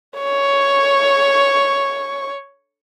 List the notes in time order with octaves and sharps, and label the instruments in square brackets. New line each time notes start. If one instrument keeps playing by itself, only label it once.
[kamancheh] C#5 C#6